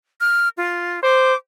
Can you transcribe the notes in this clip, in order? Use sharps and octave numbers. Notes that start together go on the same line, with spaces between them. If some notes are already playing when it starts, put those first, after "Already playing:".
F6
F4
C5 D6